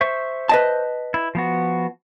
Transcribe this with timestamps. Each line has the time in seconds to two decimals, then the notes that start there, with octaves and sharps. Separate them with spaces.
0.01 C5 E5 C#6
0.49 B4 D#5 A5
1.14 E4
1.35 F3 B3 F#4